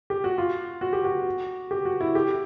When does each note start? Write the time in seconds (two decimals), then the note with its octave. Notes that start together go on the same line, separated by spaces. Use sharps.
0.10 G4
0.24 F#4
0.38 F4
0.81 F#4
0.93 G4
1.05 F#4
1.71 G4
1.85 F#4
2.01 E4
2.15 G4